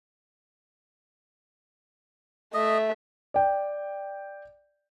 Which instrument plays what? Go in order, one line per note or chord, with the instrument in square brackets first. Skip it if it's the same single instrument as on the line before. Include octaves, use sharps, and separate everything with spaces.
[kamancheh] A3 E5 [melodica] D#5
[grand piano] D5 G5